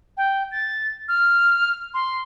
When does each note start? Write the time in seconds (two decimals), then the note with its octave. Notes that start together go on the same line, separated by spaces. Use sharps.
0.17 G5
0.52 A6
1.08 F6
1.94 C6